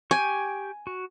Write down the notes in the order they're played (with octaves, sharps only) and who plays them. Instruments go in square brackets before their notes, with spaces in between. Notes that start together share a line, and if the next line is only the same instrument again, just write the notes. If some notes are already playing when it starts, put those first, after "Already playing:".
[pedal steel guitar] G4 G5 C#6 [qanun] G#5
[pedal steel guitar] F#4